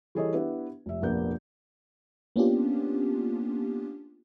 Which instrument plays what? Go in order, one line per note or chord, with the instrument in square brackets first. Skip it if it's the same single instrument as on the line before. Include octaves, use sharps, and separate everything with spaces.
[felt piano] E3 G3 G#4 A4 C#5 D#5
B3 D4 E4 G4 B4 E5
F1 E5
F1 A#1 A#3 B3 D4 G6
[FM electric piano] A#3 B3 C#4 D4 F4 G4